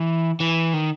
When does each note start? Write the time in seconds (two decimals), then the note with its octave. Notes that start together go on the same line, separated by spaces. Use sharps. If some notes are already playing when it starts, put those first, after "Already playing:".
Already playing: E3
0.40 E3
0.74 D#3